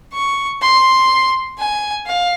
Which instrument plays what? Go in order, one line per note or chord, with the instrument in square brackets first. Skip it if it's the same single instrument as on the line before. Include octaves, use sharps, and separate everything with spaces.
[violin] C#6
C6
G#5
F5